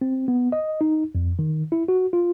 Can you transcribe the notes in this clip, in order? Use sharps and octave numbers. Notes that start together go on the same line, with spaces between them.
C4
B3
D#5
D#4
F2
D#3
E4
F#4
F4